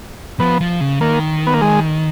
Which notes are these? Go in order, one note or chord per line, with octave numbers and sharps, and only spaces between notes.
F3 B3
F3
C#3
D#3 A#3
B3
A#3
G#3